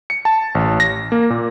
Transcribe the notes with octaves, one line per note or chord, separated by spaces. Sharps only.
C#7
A5
A1
A#6
A#3
A#2